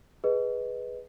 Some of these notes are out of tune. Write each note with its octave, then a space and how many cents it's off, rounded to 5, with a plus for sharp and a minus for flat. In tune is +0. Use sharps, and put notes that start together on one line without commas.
G#4 +0 B4 +0 D#5 +0